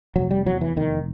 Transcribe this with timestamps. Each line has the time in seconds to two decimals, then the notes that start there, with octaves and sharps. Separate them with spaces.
0.16 F1 F#3
0.31 G3
0.46 E2 F#3
0.61 E3
0.76 F1 D#3